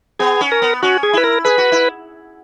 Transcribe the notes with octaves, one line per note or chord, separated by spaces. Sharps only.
B3 G#4
C#4
A#4
B3
C#4 F#4
G#4
E4 B4
A#4
G#4 B4
F#4
E4